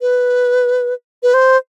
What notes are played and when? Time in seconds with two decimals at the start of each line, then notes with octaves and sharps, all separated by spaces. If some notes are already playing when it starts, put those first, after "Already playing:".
0.01 B4
1.23 B4
1.34 C5